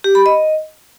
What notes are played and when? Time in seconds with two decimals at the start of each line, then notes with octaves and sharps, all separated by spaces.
0.04 G4
0.15 B5
0.26 D#5